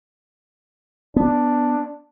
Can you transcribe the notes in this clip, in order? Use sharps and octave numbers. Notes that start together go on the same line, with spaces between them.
B3 D4